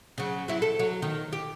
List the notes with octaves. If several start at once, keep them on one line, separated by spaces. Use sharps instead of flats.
C#3 F#3
F#3 E4
A4
F#3
D#3
G4